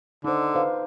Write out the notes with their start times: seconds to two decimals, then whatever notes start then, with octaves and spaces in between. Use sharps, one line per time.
0.24 D3 D#4 C5
0.54 B4 C5 F5